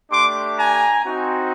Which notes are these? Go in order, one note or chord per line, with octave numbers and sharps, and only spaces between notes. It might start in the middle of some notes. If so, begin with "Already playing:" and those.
A3 D4 G4 C6 D6
G#5 A#5
C4 D#4 F#4